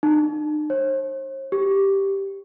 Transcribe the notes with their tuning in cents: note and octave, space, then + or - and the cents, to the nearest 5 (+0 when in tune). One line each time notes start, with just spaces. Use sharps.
D#4 -45
C5 +45
G4 +0